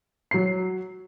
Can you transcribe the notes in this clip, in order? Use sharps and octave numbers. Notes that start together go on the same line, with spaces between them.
F#3 C7